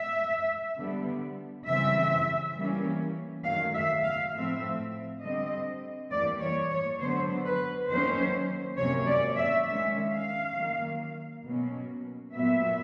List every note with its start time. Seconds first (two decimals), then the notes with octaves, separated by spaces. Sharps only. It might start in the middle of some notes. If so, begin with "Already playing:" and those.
Already playing: E5
0.78 D3 G3 B3
1.66 C#3 E3 G3 C4 E5
2.56 E3 G3 A#3 C#4
3.44 D#3 F#3 A3 F5
3.74 E5
4.04 F5
4.33 A2 F3 A3 C4 E5
5.22 D3 G3 C4 D#5
6.11 E3 G3 A#3 D5
6.40 C#5
6.70 C#5
6.99 D3 F#3 B3 C5
7.45 B4
7.89 D#3 F#3 A#3 C#4 C5
8.77 C3 D#3 F#3 A#3 C#4 C#5
9.07 D5
9.37 E5
9.66 D#3 G#3 C#4 E5
10.11 F5
10.56 D#3 F#3 A#3
11.44 B2 F#3 A#3 C#4
12.33 A#2 F#3 B3 E5